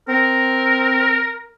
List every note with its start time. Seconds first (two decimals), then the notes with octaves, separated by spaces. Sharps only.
0.09 C4 A#4